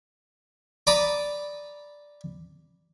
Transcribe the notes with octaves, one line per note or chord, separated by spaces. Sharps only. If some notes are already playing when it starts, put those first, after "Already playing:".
D5 A#5 B5 D#6